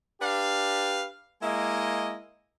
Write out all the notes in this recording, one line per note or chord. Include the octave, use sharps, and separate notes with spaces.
D4 G4 B4 F5
G#3 A#3 E4 D#5